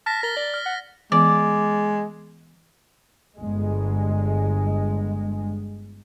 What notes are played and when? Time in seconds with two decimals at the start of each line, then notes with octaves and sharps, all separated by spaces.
0.06 A5 F6 A#6 B6
0.23 A#4 A6 G7
0.36 D5
0.54 F6
0.66 F#5
1.12 E3 G#3 B3 D5
3.38 G1 G#3